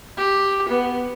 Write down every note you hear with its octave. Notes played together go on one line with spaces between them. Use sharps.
G4
B3